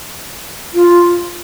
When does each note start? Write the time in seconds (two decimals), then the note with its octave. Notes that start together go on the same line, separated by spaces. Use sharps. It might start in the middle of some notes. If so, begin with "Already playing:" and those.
0.74 F4